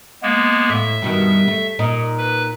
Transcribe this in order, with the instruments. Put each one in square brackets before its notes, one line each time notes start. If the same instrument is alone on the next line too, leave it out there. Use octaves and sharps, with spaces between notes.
[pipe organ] G#3 A#3 B3
[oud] A2 [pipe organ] E5
[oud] G2 B2 D#3
A3
A#2 D#4
[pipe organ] B4